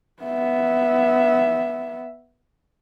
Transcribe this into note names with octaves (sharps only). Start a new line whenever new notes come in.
B3 E5